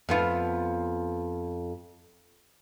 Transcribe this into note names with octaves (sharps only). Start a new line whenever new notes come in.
F2 B3 F4